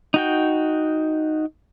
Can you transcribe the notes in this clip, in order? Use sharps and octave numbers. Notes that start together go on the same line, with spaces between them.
D#4 F#4 G5